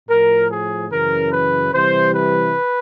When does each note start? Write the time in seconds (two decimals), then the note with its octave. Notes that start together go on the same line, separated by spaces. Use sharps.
0.09 A2 F3 A#4
0.50 G#4
0.91 F#2 C#3 E3 A#4
1.32 B4
1.73 C3 E3 G3 C5
2.14 B4